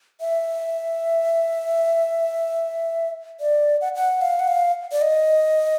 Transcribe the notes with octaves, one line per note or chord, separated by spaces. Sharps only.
E5
D5
F#5
F#5
F5
F#5
F5
D5
D#5